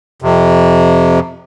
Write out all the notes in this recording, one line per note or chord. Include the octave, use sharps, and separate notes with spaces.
F2 C3